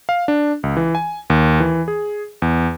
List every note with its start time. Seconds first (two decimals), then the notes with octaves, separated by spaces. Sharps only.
0.09 F5
0.28 D4
0.63 C#2
0.77 E3
0.95 G#5
1.30 D#2
1.60 E3
1.88 G#4
2.42 E2